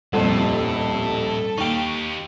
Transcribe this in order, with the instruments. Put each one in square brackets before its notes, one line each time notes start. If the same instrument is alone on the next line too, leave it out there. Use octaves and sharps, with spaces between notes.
[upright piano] D#1 C2 F2 [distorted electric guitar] A2 [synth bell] G3 [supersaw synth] A4
[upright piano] D#2 [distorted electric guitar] D#4 G4 [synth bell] G5 C#6